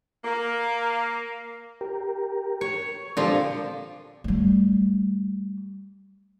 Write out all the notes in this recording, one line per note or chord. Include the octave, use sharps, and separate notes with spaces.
A#3
G4 A#4
C#5
A#2 D3 F3 G#3 C4 G4
G3 A3